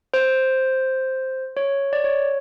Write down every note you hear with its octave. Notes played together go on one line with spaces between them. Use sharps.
C5
C#5
D5
C#5